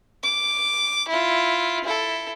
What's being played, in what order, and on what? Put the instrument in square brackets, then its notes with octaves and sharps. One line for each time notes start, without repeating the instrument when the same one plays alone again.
[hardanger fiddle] D6
E4 F4
E4 A4